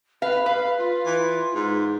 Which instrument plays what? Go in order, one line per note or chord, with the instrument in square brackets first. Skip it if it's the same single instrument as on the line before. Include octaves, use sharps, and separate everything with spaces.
[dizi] B4 [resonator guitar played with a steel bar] F5
[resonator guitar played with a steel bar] B4 [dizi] F5
[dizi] F4
[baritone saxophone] E3
G#2